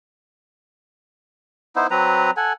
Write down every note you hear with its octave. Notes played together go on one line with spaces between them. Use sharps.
B3 D#4 E4 C5
F#3 C4 B4 A#5
A4 F#5 G#5